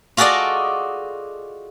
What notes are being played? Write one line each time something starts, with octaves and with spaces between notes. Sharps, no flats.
F4 F#4 G#4 A4 D5 D#5